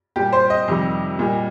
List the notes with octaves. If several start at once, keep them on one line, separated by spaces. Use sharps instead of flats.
A#2 G3 G4
C5
D#5
F2 C3 D#3 G3
A#2 G3